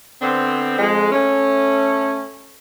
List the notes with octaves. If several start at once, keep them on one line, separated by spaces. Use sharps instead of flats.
D3 B3 C4
F2 G#3
A3 C#4